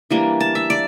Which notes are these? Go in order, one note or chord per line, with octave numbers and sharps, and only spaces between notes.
E3 G3 A#3 D4
A5
E5
D5